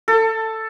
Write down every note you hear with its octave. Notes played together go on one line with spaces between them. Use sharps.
A4